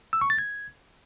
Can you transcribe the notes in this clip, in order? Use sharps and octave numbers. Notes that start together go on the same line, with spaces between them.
E6
C#6
A6
G#6